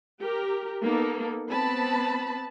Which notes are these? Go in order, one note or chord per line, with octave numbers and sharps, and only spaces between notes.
G4 A#4
A#3 B3 D#4 A4
B3 C4 A5 B5